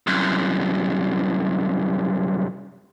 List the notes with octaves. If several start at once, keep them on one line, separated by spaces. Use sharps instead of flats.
C2 F#2